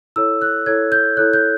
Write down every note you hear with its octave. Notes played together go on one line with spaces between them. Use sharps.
E4 A4 C#5 E6
F#6
E4 A4 C#5 G#6
G6
E4 A4 C#5 F#6
G6